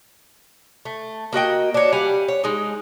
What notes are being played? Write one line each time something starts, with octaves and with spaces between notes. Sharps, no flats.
A3
A#3 F#4 D#5 G5
D4 C#5
G3 F5 F#5 G#5
C#5
G#3 D#4